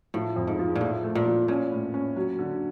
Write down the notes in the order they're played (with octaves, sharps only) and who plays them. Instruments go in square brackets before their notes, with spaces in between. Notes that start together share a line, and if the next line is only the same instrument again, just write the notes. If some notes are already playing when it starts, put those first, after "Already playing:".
[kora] A2 [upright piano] F3
[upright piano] F2
[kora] G#2
[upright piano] F3
[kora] A#2
[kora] A2 [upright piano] F3
[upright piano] A3
[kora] A#2
[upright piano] F3
[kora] A#2 [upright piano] C#4
[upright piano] A2
C#4
F#3
D3